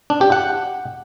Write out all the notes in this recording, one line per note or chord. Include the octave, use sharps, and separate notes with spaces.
D4
G4
F#5